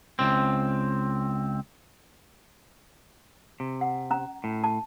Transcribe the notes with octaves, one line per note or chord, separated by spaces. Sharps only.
C#2 C4
C3
F#5
C#4 A#5
A2
A5